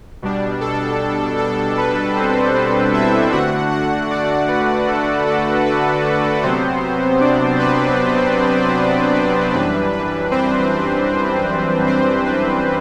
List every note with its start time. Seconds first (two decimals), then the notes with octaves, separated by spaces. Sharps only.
0.22 B2 G3 D4
0.61 A4
1.39 A4
1.78 B4
2.16 C4 C5
2.55 C4 C5
2.94 E4 E5
3.32 D3 A3 D4 F#4 F#5
3.71 F#4 F#5
4.10 D4 D5
4.49 B4
4.88 A4
5.27 A4
5.66 B4
6.43 C3 F#3 B3 C4 C5
7.21 D4 D5
7.59 B4
8.76 C4 C5
9.15 B4
9.54 F#2 E3 G3 D4 B4
9.93 B4
10.31 C4 C5
11.86 C4 C5
12.26 B4